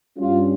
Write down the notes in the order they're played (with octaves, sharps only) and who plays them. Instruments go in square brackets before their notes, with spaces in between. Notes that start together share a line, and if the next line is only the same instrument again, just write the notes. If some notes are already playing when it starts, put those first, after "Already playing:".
[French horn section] G2 G3 C#4 F4